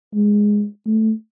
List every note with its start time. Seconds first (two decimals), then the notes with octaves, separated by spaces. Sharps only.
0.15 G#3
0.87 A3